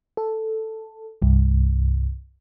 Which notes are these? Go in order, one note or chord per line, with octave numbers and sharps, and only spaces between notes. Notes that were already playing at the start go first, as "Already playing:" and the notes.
A4
C2 G2